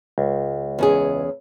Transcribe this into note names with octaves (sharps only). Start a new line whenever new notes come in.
C#2
E2 C#4 G#4